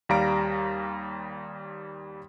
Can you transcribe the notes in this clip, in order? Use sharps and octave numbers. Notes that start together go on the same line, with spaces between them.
D#2 G3 F5 A#5 D7